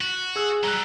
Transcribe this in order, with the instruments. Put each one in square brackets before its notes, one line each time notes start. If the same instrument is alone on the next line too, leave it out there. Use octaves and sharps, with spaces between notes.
[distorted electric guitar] F#4
[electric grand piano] G#4 E6 F#6
[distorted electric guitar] F#3 G3 [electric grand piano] A#5 F#6